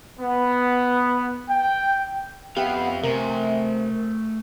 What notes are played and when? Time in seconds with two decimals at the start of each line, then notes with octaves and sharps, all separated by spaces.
0.20 B3
1.49 G5
2.57 F2 B3 G4 E5 F5 G5
3.03 C3 A3 A#4 G#5